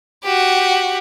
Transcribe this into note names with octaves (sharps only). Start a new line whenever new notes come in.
F#4 G4